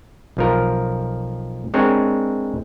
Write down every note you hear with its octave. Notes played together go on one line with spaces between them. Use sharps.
B1 F3 A#4
G#3 C4 D4 A#4 C#5